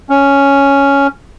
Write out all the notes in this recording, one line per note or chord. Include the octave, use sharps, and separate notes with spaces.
C#4